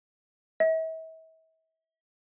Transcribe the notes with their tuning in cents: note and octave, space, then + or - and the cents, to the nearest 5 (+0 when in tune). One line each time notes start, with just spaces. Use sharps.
E5 -40